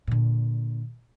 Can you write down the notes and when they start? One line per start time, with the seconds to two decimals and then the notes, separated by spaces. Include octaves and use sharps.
0.07 A#2 D3